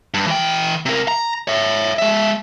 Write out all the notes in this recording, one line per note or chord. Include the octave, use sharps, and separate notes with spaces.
G2
E3 G5
C3 A#4
A#5
C#5 E5
G#3 E5